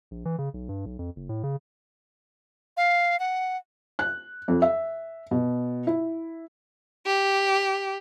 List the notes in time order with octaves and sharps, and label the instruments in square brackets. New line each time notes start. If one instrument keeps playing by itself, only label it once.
[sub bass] A#1
E3
C#3
B1
G2
B1
F2
F#1
A2
C#3
[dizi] F5
F#5
[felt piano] F#6
F2
E5
B2
E4
[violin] G4